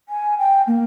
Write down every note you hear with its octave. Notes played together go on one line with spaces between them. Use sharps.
G#5
G5
A#3